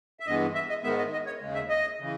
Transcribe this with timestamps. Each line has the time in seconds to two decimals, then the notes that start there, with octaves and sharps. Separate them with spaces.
0.20 E5
0.27 G2 E3 G#3 B3 D#5
0.54 E5
0.69 D#5
0.83 G#2 D#3 G#3 B3 E5
0.98 D#5
1.12 D#5
1.26 C#5
1.41 D#2 C#3 G#3
1.54 E5
1.69 D#5
2.00 C#3 E3